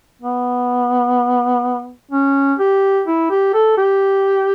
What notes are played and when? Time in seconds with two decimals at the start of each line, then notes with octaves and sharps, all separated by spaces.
0.22 B3
2.11 C#4
2.59 G4
3.07 E4
3.30 G4
3.54 A4
3.78 G4